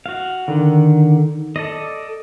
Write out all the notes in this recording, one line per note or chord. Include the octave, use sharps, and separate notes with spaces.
F#4 F5
D3 D#3
A4 D5 D#5